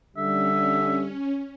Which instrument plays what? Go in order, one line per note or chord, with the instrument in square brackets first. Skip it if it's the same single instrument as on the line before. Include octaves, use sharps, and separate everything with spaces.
[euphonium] D3 [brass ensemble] G3 [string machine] C#4 [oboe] E5